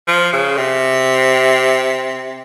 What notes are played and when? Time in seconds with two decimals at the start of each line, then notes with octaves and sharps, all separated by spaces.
0.07 F3
0.32 C#3
0.57 C3